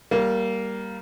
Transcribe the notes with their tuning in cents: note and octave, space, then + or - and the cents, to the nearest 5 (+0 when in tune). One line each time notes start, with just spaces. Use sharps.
G3 -15 A#3 +0